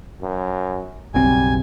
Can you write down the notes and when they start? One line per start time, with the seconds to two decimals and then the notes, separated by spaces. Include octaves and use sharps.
0.22 F#2
1.14 F#1 B1 G3 C4 G#5